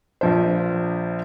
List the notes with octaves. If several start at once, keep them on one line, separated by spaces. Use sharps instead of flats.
A#1 F3 C5